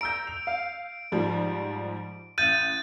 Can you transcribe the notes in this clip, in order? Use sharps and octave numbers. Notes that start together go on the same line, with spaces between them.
A#5 E6 G6 D7
F7
F5
G#2 F3 G3
A1 F#6 G6 A6 D#7